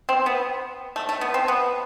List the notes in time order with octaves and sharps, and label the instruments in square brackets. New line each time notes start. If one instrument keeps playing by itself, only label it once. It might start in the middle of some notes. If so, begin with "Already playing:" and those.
[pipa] C4
B3
A3
A3
B3
C4
B3